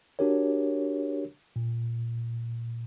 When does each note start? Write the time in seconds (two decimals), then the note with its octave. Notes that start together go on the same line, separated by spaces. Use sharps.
0.19 D4 F#4 G4 A#4 C#5
1.56 A#2